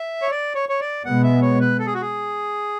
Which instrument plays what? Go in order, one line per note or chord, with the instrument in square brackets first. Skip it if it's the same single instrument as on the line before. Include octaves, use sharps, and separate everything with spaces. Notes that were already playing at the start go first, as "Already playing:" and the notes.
Already playing: [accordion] E5
C#5
D5
C#5
C#5
D5
[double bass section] B2 G#3 B3 [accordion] F#5
[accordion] E5
C#5
B4
A4
G#4
F#4
G#4